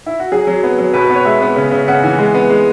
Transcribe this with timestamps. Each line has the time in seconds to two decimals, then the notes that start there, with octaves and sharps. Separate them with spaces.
0.06 E4
0.20 F#4
0.32 F#3 G#4
0.47 F#3
0.63 B3
0.78 F#3
0.94 B2 B4
1.04 B4
1.10 B3
1.15 C#5
1.25 G#3 E5
1.42 B3
1.56 C#3
1.72 C#3
1.88 C#3 F#5
2.04 E3
2.19 G#3
2.34 B3
2.50 G#3